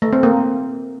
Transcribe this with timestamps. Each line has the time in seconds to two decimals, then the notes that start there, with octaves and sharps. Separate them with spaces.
0.02 A3
0.13 C4
0.23 A#3